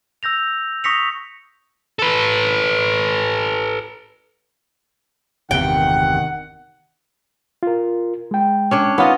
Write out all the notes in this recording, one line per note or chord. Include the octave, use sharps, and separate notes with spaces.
E6 G6 A#6 F7
C#6 D#6 A#6 B6 C#7 F7
A4 B4
G1 E2 C3 D#3 F#5 G5
F4 A#4
G#3 G5
C#4 D4 C#5
B3 D#4 F4 C#5 D#5 F#5